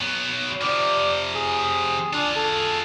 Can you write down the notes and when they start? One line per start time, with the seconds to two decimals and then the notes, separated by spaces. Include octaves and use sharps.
0.01 F#3 B3
0.61 C3 F3 D5
1.35 G#4
2.13 D4 F4 G#4
2.36 A4